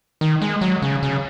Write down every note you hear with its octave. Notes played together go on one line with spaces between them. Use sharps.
D#3
G#3
F#3
C#3
C#3